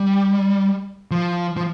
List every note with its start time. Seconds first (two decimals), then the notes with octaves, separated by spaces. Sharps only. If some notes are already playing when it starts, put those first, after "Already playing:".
Already playing: G3
1.11 F3
1.57 F3